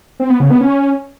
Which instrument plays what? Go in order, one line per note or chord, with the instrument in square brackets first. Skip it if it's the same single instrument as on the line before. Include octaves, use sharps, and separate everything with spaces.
[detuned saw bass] C4
B3
C#3
B3
C#4